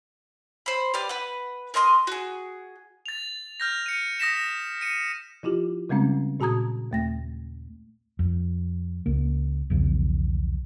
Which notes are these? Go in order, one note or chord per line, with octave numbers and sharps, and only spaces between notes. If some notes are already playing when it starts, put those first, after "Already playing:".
C5 B5
G4 B4 D5 F6
B4 F#5
A#4 D#5 C6 D#6
F#4 G#4
A6 F7
F6 G6 A#6
C#7 D#7
D#6 A#6 B6 E7
C#7 D#7
F3 E4 F4 G4
C#3 G3 G#3 C4 C#4
A#2 F#4 A5 A#5 D#6 G#6
D#2 A3 A#6
F2
C#2 A#3
B1 E2 C#3 F3